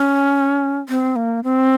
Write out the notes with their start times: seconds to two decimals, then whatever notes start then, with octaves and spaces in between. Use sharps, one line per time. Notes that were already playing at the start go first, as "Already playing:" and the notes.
Already playing: C#4
0.89 C4
1.16 A#3
1.44 C4